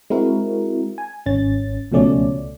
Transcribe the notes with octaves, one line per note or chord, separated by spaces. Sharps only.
G#3 C4 E4 F#4 A#4
G#5
G#1 C#4 A6
C#2 B2 F3 A3 C#4 D5